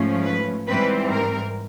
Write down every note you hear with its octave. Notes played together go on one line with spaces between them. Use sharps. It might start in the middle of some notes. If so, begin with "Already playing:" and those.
Already playing: G#2 F3 A3 C#4
B4
G#2 E3 G3 C4 B4
A#4